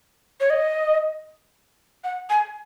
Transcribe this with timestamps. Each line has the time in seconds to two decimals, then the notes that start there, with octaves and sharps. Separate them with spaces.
0.40 C#5
0.50 D#5
2.04 F#5
2.30 G#5